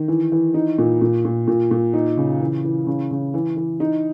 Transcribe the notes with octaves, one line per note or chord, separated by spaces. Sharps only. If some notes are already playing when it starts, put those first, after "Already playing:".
Already playing: D#3
E3
E3
D#4
A#2
A#2
A#2
A#2
A#2
D#4
C#3
E3
E3
C#3
C#3
E3
E3
D#4